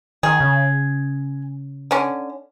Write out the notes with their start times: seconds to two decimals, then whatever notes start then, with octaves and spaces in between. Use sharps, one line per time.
0.23 D#3 G#4
0.40 C#3
1.91 D3 C#4